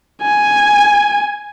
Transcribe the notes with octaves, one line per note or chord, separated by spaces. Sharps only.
G#5